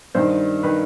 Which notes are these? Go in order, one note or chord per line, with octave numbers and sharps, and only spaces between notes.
G2 D#3 C5
D#3 B4